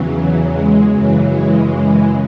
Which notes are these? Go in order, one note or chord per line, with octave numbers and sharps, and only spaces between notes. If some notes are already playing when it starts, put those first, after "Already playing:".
Already playing: E2 C#3 E3 F#3
G#3
F#2 C#3 E3 F#3
G#3